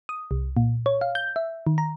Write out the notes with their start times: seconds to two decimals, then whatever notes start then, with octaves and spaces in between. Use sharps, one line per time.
0.09 D#6
0.31 C2
0.57 A#2
0.86 C#5
1.01 F5
1.15 G6
1.36 E5
1.67 D#3
1.78 A#5